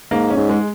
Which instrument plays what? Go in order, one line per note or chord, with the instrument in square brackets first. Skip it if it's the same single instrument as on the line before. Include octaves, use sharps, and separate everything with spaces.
[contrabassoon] G#2 [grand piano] A#3
[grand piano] C#4
[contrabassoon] G#2
[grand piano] G#3